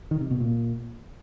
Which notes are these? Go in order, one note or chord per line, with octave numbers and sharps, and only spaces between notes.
D#3
C3
B2
A#2